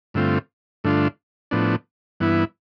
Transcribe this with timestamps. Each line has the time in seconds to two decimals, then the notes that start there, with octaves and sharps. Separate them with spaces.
0.14 G2 D3 A3 C4 F4
0.84 G2 D3 A3 D4 F4
1.51 A2 F3 B3 D4
2.20 G2 E3 B3 E4